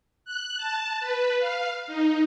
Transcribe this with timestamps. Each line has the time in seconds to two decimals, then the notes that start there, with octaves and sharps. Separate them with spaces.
0.25 F#6
0.57 A5
1.00 B4
1.39 F5
1.87 D#4